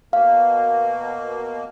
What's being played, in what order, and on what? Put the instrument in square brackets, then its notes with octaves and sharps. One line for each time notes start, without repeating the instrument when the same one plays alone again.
[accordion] B2 A#3 [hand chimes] F5